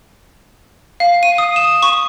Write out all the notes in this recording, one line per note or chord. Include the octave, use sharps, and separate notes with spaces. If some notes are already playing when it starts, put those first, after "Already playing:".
F5
D#7
D#6
E7
C#6